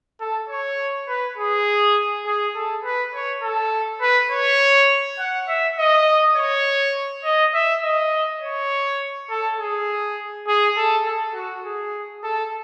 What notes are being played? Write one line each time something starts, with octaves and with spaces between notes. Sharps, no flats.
A4
C#5
B4
G#4
G#4
A4
B4
C#5
A4
B4
C#5
F#5
E5
D#5
C#5
D#5
E5
D#5
C#5
A4
G#4
G#4
A4
A4
F#4
G#4
A4